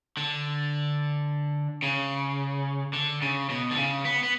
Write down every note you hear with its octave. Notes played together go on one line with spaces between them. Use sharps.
D3
C#3
D3
C#3
B2
D3
C#3
B3
B3